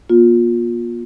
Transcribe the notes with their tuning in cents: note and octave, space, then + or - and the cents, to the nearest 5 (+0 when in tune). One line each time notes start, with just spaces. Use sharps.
A#3 +45 F4 +20